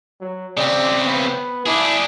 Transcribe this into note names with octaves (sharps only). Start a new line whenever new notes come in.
F#3
C#3 C4 D5
B3
D4 E4 G#4